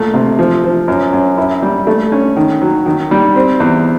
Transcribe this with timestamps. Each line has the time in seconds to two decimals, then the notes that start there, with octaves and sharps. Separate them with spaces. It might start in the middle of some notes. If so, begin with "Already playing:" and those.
Already playing: A#2 A3
0.14 C3
0.39 F3
0.64 F3
0.88 F#2
1.13 F#2
1.37 E4
1.62 G3
1.87 A3
2.12 C#4
2.36 D#3
2.61 F#3
2.86 D#3
3.11 G3
3.36 C4
3.60 E2